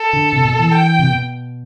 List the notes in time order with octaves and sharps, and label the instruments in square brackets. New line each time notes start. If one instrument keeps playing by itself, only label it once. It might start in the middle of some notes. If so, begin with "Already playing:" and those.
Already playing: [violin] A4
[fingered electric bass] D3
C3
B2
E3
[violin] G5
[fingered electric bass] C3
B2